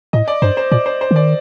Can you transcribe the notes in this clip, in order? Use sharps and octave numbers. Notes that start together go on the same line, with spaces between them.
A2 D#5
D5
G2 C5
C5
A#2 D5
C5
C5
D#3
D5